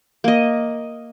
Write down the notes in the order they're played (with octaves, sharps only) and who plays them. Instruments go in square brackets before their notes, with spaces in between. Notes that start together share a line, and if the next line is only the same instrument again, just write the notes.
[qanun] A#3 D#5